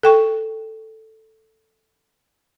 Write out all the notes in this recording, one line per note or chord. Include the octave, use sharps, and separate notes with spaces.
A4 G5 C#6